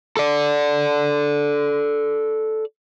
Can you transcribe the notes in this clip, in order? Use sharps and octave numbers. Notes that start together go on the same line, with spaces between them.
A4 D5